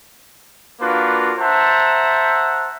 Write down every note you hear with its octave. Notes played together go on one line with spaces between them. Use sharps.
A#3 D4 F4 F#4 B4
C5 E5 F#5 A5 A#5